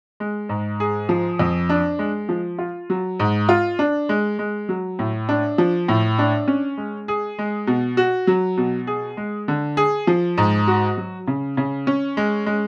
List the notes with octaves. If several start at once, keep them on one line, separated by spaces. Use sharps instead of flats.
G#3
G#2
G#4
F3
F2
D4
G#3
F3
F4
F#3
G#2
F4
D4
G#3
G#3
F#3
A2
D4
F3
A2
D4
C#4
G#3
G#4
G#3
B2
F#4
F#3
B2
G#4
G#3
D3
G#4
F3
G#2
F#4
F#3
C#3
C#3
C#4
G#3
G#3